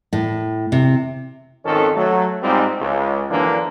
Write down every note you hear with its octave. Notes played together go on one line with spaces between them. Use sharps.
A2
C3
G#1 F2 D#3 C#4 A4
F#3 A3
G#2 G3 G#3 C4 D#4 F4
C#2
F#2 D3 E3 F3 A#3 D4